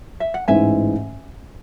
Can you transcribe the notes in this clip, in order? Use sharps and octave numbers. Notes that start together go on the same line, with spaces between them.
E5
F#5
A1 G#2 E3 E5 G#5